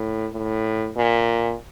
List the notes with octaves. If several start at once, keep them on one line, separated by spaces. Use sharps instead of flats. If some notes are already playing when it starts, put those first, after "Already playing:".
Already playing: A2
A2
A#2